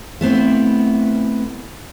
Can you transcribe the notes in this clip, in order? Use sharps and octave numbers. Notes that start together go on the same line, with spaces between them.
A3 B3 C4 E4